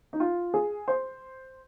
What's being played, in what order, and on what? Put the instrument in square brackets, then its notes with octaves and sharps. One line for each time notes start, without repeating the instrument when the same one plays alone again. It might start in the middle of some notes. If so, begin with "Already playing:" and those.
[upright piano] D#4
F4
G#4
C5